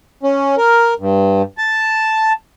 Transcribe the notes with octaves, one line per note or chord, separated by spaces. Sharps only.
C#4
A#4
G2
A5